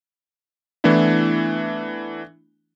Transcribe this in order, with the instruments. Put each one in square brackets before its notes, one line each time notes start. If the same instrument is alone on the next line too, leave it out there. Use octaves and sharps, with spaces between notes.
[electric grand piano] E3 A3 B3 D4 E4